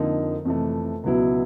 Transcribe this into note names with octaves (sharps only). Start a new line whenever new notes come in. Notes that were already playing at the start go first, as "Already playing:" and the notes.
Already playing: F2 D3 F3 A#3 D#4
F2 C3 E3 A3
C#2 B2 F#3 B3 E4